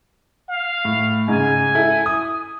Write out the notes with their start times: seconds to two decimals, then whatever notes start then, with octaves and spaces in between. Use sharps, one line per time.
0.49 F5
0.85 A2
1.28 G#2 C#3 G#5
1.75 E4 A4
2.06 D#6